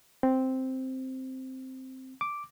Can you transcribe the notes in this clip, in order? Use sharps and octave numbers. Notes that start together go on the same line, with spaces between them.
C4
D6